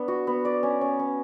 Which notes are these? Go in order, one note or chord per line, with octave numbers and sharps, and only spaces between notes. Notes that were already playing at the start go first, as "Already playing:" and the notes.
Already playing: B3 D4
F#4
B3
D5
C#4
C#4
C#4